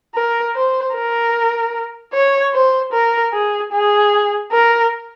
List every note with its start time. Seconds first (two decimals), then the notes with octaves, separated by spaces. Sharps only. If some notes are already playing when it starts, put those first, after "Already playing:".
0.15 A#4
0.55 C5
0.94 A#4
2.13 C#5
2.53 C5
2.93 A#4
3.33 G#4
3.72 G#4
4.52 A#4